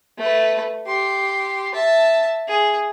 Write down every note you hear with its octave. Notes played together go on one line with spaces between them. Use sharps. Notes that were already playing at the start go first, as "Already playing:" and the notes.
A3 B4
G4 C6
E5 A5
G#4